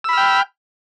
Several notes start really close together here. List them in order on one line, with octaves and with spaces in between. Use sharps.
E6 B5 F6 G5